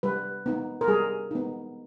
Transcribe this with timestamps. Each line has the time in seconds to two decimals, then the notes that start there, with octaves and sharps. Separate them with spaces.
0.03 G3 B4
0.46 B3 D#4
0.81 A#4
0.88 G3 G#4
1.31 B3 D#4